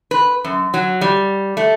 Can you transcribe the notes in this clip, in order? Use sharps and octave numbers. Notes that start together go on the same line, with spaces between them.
B4
F#2
F#3
G3
A3